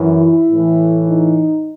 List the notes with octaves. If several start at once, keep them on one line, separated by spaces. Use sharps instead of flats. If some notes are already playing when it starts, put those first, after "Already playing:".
Already playing: F#2 E3
E4
A2 E3
D#4